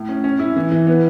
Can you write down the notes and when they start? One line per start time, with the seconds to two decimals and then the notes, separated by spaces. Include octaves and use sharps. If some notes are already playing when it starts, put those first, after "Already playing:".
Already playing: A2
0.09 C#4
0.24 C#4
0.39 E4
0.56 E3
0.72 E3
0.87 B3